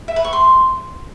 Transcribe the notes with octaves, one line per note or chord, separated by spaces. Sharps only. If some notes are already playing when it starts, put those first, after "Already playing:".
E5
B4
C#6
C6